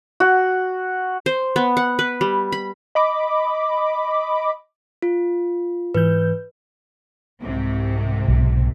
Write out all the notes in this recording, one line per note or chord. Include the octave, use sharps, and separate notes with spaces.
F#4
C5
B3
F#5
B4
G3
B5
D#5 B5 D6
F4
G#2 E3 B4 G6
C2 G#2 C3
B1